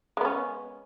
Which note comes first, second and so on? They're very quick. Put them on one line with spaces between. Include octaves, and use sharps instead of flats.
G#3 B3 C#4